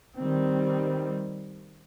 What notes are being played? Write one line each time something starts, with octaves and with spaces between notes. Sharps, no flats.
D#3 G3 C4